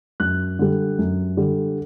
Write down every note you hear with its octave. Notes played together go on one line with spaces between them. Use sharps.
F#2 F#6
D3 G3
F#2
D3 G3